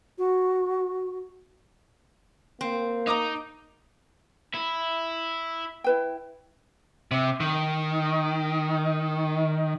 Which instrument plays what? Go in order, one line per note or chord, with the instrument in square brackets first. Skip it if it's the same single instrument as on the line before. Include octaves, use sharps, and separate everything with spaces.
[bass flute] F#4
[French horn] A#3 [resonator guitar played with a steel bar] C4
[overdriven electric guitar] D#4 [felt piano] A#5 D6 D#6
[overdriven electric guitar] E4
[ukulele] E4 B4 G5
[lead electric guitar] C3
D#3